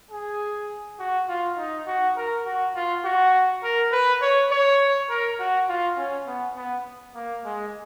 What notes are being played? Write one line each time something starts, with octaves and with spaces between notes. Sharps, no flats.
G#4
F#4
F4
D#4
F#4
A#4
F#4
F4
F#4
A#4
B4
C#5
C#5
A#4
F#4
F4
C#4
B3
B3
A#3
G#3